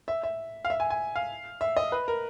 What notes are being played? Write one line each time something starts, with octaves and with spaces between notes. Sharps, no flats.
E5
E5
F5
E5
G#5
G#5
F5
E5
D#5
B4
A#4